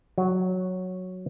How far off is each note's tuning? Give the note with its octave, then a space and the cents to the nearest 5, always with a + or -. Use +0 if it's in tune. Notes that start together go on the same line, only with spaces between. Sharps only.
F#3 -5